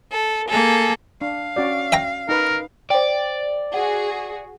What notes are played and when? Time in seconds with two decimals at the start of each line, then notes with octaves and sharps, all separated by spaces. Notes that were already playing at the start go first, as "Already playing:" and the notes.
0.11 A4
0.48 A#3 G#4 A4
1.21 D4 F5
1.56 C#4 F#4 D5
1.92 E5 G5 A#5
2.29 D#4 A#4 B4
2.90 C5 D5 G5
3.74 F#4 G#4 F#5